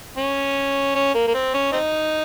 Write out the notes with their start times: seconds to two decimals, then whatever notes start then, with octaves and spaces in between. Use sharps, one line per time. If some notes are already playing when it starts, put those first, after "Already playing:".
0.17 C#4
0.95 C#4
1.14 A#3
1.27 A#3
1.34 C4
1.54 C#4
1.73 C4 D#4